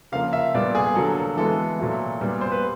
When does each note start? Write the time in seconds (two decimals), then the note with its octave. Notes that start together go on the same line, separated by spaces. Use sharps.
0.12 C#3 F3 A#3 F5
0.33 E5
0.54 A#2 G3 B3 D5
0.75 G#4
0.95 D3 F#3 A#3 A4
1.17 A4
1.37 E3 G#3 B3 A4
1.79 A#2 F#3 A3
2.21 A#2 G3 B3
2.41 C5
2.52 B4